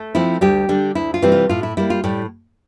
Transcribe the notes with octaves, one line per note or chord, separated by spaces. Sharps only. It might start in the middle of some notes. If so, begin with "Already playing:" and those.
Already playing: A3 A4
F3 C4 E4
D2 G3 G4
D3 G3 D4
D2 E4
F4
C3 E3 G3 C4
F4
A2 F4
E4
G3 A#3 E4
F4
A2 G3 G4